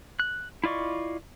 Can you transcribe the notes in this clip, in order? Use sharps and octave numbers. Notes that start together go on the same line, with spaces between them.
F#6
E4 F4 D5 D#5 C#6